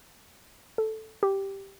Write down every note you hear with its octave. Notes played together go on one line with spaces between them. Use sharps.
A4
G4